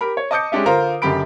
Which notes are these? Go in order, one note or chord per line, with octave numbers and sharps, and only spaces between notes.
G4 A#4 B5
C#5
D#5 A5 D6 D#6 G6 C#7
G#3 C#4 D4 G4 E5
D3 F4 A#4 C5 A#5 C6
F#1 F#2 D3 G4 B5 D7